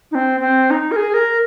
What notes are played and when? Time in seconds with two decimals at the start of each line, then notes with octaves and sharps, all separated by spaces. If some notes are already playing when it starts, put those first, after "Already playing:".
0.11 D#4
0.15 C4
0.40 C4
0.70 D#4
0.91 A#4
0.96 G#4
1.14 A#4